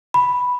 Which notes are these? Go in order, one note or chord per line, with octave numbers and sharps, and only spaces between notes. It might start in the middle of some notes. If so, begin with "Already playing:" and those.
B5